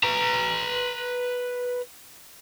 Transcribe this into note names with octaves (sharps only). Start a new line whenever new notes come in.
B4 A#5